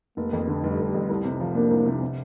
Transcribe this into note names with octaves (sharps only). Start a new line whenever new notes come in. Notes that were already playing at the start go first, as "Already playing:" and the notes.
F1 A#3
F2
D3
F1 G3
F1
F2
C2
C3
F3
A#3 D4
C2
C3
C3